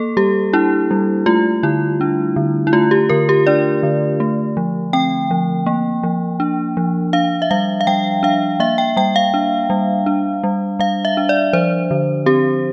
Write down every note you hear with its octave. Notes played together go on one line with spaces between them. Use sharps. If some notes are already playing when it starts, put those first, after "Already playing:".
Already playing: A#3 A4
G3 G4
D4 E4
G3
A3 F4
D3 E4
D4
D3
E4
A3 F4
G4
D3 A#4
G4
D4 D5
D3
A3
F3
C4 G5
F3
A#3
F3
D4
F3
D4 F5
E5
G3 F5
F5
G3 G5
D4 F5
A#3 E5
G5
G3 G5
F5
D4
G3
D4
G3
G3 F5
E5
D4
D5
F3 C5
D3
C4 G4